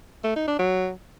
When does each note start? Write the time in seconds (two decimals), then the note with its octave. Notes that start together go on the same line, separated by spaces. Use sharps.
0.24 A3
0.36 D#4
0.47 D4
0.59 F#3